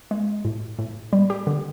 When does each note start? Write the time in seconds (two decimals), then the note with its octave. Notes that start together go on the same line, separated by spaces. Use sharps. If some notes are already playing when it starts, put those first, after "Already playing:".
0.11 G#3
0.45 A2
0.79 A2
1.13 G3
1.30 G4
1.47 D3